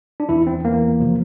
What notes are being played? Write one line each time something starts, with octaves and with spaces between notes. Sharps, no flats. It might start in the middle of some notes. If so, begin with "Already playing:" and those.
D4
E2 E3 E4
C4
E2 E3 A#3
C3 F3